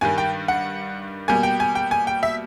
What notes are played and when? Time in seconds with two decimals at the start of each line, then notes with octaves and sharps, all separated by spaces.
0.01 G2 D#3 G3 G#5
0.18 G5
0.48 F#5
1.28 B2 G3 A#3 G#5
1.43 G5
1.60 G#5
1.75 G5
1.91 G#5
2.07 G5
2.23 E5